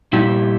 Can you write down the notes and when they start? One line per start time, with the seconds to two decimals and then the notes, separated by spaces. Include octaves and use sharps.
0.13 A#2 G3 E4 G4